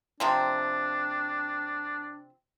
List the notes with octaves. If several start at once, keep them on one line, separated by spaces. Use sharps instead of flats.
C3 F3 C4 D4